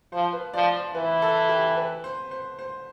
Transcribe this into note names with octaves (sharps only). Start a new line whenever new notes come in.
F3 C5
B4
F3 D5
C5
E3 B4
A4
G4
B4
C5
C5
C5